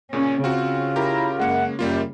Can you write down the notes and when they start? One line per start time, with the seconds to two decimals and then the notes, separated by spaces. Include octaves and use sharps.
0.13 A#2 C#3 C#4
0.44 C#3 C4 F4 F#4
0.96 E4 G4 A#4 A#5
1.39 F#2 G#3 A#3 F#5
1.79 F#2 G3 A#3 F4 G4